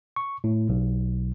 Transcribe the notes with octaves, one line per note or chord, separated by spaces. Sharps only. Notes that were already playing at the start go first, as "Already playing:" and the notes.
C#6
A2
B1